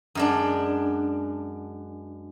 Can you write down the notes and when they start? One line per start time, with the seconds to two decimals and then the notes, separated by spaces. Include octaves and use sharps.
0.15 F#2 G#3 D4